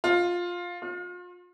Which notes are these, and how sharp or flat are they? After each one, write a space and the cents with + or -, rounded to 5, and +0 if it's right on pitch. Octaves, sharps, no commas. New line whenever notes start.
F4 +10
F4 +35